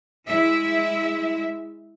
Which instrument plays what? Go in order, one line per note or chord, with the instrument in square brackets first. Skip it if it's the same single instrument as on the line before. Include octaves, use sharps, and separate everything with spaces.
[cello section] G#3 E4 E5